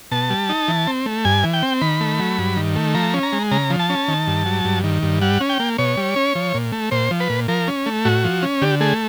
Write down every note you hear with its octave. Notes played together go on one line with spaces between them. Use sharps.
B2 A5
G3
D#4
E3
C4
A3
G2 G#5
E3
G5
C4
D#3 B5
A3
F#3
G2
D#3
A3
F3 A#5
C#4
A#5
G#3
C#3 A#5
F3
A5
C#4
D#3
G2
F#3
G2
D#3
G2
G3 F#5
C#4
G5
A#3
B2 C#5
G3
C#4
F3
A#2
A3
A#2 C5
F3
B4
A#2
F3 A#4
C#4
A3
A2 F#4
F3
C#4
D3 G4
A3 G#4